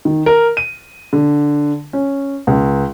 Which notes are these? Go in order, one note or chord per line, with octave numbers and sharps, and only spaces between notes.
D#3
A#4
D#7
D3
C#4
C#2